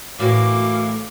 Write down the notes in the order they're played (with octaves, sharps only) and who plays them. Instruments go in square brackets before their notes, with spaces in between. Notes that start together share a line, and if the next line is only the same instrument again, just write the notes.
[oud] A2 [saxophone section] E3 A#3 [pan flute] F#4 [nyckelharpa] D6